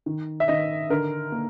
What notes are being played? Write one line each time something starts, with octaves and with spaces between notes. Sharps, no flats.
D#3
E5
D#3 D#5
D3 A#4
A#3